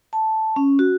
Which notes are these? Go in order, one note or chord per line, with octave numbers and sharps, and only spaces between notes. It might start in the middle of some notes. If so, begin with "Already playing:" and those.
A5
C#4
F#4